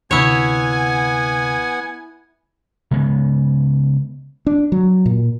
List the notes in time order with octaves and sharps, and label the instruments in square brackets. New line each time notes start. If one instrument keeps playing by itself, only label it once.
[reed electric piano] D2 C3 [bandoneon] B3 F#5 [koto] E4 C#5 [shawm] G#5
[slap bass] C#3 G#3 B3
[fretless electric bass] D4
F#3
A#2